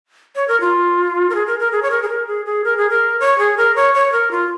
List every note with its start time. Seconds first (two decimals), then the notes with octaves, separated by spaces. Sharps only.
0.36 C#5
0.48 A#4
0.61 F4
1.30 A#4
1.35 G#4
1.47 A#4
1.59 A#4
1.72 G#4
1.83 C#5
1.91 A#4
2.02 G#4
2.09 A#4
2.27 G#4
2.46 G#4
2.64 A#4
2.77 G#4
2.90 A#4
3.20 C#5
3.38 G#4
3.57 A#4
3.76 C#5
3.94 C#5
4.12 A#4
4.31 F4